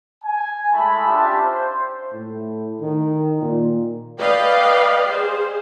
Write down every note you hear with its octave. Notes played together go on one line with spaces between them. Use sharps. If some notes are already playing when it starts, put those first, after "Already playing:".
G#5
G#3 A3 E4 A5 B5
C#4 D4 F4 G4 E5 A5
C5
A2
D#3
A#2
B4 D5 D#5 F5 G5
G#4 C5